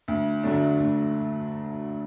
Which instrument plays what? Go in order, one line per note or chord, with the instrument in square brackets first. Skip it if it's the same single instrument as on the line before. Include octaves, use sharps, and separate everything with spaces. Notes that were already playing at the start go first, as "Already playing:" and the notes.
[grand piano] D2
D3 F#3 A3 D4
D2